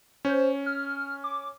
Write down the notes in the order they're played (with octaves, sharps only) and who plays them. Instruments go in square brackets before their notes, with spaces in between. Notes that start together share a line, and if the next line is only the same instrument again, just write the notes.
[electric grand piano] C#4 [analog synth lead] C5
[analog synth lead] F6
D6